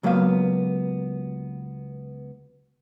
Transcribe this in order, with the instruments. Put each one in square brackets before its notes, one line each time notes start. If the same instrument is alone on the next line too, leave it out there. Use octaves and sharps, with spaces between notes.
[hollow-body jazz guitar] C#2 F#3 A#3 B3 F5